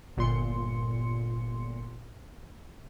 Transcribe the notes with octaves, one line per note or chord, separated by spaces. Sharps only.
G1 A#2 C6 C#7